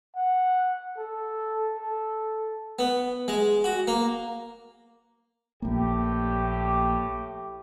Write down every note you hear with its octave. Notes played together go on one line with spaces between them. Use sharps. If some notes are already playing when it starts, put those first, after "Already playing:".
F#5
A4
A4
B3
G#3
F#4
A#3
A#1 A2 A#3 G4